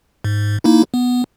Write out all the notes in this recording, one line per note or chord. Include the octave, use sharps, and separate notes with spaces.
G#2
A#3 D#4 E4
B3